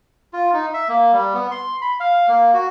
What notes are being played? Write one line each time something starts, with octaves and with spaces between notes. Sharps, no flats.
F4
D#4
E5
A#3
G3
B3
C6
B5
F5
A#3
F#4